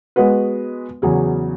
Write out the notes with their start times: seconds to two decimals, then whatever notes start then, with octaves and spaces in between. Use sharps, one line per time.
0.16 G#3 B3 F#4 B4
1.02 E2 C#3 F#3 C#4 G#4